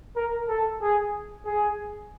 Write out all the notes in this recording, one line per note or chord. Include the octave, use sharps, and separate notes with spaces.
A#4
A4
G#4
G#4